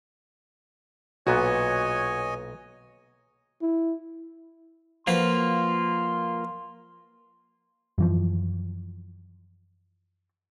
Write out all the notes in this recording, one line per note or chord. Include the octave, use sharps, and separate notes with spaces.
B1 A#2 B3 F#4 C#5 D#5 G#5
E4
F3 A#3 F4 F#4 B4 C6
F#2 E3 F3